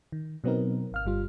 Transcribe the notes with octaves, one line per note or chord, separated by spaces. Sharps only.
D#3
B2 F#3 B3 C4 D#4 A#4
G#1 F5 F6
G1 G3 F4